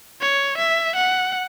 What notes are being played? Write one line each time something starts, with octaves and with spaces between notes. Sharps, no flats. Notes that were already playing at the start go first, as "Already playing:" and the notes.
C#5
E5
F#5